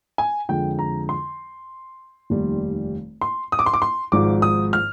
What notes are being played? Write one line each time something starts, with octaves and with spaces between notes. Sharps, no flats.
G#5
F2 D3 G#3 G5
A#5
C6
F1 D#2 D#3 G3
C6
D#6
D6
C6
D6
C6
G#1 G#2 F3 D6
D#6
F6